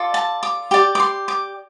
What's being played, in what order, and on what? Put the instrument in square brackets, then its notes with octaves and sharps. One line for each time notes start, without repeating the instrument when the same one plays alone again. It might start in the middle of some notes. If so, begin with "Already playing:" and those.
Already playing: [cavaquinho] F4 A4 D5
A5
D6
G4 D5 D6
D6
C6
D6